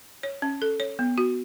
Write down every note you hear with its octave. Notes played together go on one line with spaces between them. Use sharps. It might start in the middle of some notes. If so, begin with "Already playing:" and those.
C#5
C#4
A4
C#5
B3
F#4